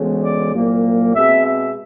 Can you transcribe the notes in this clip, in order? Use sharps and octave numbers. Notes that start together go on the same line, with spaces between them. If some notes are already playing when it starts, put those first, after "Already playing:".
Already playing: D2 C#3 E3 G#3 B3
D5
C2 A#2 F#3 A#3
B2 G#3 C4 E5
E5